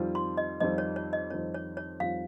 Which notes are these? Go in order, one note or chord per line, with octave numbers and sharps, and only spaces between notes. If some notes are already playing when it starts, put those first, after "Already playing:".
Already playing: F2 D#3 G3 C4 F4
C6
D#5
F2 D#3 G3 C4 F4 D#5
C#5
C#5
D#5
F2 D#3 G3 C4 F4 C#5
C#5
C#5
F2 D#3 G3 C4 F4 F5